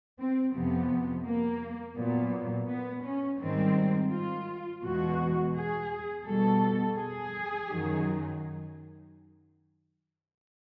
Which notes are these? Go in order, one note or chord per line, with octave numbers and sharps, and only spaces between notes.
C4
F2 C3 F3 B3
A#3
A#2 F#3 B3
B3
C#4
G#2 D#3 G3 C4
F4
E2 B2 G#3 F#4
G#4
B2 G3 A4
G#4
F#2 D#3 F#3